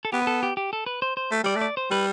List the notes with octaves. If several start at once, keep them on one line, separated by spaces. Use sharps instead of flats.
A4
B3 G4
B4
A4
G4
G4
A4
B4
C5
C5
A3
G3 D5
A3
D5
C5
G3 B4